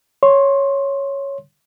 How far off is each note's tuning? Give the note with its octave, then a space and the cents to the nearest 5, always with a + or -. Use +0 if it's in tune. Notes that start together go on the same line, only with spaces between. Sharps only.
C#5 +0 C6 +15